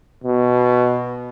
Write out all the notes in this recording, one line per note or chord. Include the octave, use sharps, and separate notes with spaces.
B2